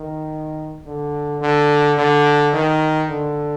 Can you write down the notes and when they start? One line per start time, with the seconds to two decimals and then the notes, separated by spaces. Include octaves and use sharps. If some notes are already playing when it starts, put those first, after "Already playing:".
Already playing: D#3
0.86 D3
1.42 D3
1.98 D3
2.54 D#3
3.09 D3